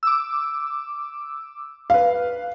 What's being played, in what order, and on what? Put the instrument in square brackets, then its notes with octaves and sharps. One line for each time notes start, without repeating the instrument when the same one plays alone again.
[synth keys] D6 E6
[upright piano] B4 F5